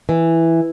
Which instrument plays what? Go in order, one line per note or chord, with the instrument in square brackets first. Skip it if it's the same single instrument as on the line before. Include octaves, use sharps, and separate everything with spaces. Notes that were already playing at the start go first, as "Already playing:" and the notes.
[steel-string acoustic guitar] E3